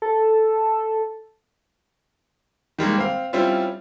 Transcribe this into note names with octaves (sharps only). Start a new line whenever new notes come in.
A4
D#3 G3 G#3 A#3
C4 F5
G3 C4 C#4 E4 F4